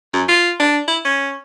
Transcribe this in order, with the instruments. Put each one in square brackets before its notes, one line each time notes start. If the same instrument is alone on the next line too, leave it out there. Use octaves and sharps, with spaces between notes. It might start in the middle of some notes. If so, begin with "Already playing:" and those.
[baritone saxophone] F#2
F4
D4
E4
C#4